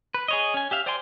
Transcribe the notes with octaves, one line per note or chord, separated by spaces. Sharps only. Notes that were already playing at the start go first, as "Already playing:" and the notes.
B4
G#4 C#5 D#5
C#4 G#5
G4 E5 F5
C5 D5 G5 G#5 C6